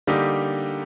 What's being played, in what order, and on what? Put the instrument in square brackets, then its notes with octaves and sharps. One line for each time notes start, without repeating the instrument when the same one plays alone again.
[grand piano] D3 G3 A#3 D#4 G4